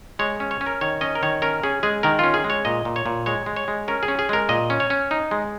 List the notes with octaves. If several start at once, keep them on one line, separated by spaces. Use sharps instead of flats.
G#3 C#5
C#4
C#5
C#4
A#4
D#3 C#5
C#4 D#5
A#4
D#3 C#5
C#4 A#4
C#4 G#4
G#3 G#4
D#3 A#4
C#4 F4
G#4
G#3
C#5
A#2 D#5
A#2
C#5
A#2
G#3 C#5
G#3
C#5
G#3
C#4 A#4
G#4
C#4
G#4
G#3 A#4
A#2 D#5
C#4
C#5
C#4
D#4
G#3